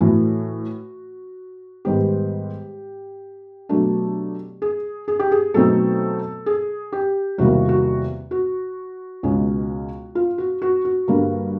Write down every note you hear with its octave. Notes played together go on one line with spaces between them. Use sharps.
A2 E3 A3 F#4
G#2 D#3 G3 B3 G4
B2 F#3 A3 D4
G#4
G#4
G4
G#4
B2 F#3 A3 C4 D#4 A4
G#4
G4
E2 C3 D#3 G3 A#3 F#4
F#4
F#4
C#2 B2 G#3 C#4
F4
F#4
F#4
F#4
G2 D3 G3 A#3